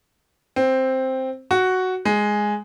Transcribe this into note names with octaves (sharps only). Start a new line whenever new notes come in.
C4
F#4
G#3